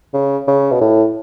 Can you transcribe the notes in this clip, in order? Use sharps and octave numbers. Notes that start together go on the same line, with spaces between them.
C#3
C#3
B2
A2